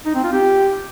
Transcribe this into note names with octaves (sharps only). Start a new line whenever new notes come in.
D#4
C4
F4
G4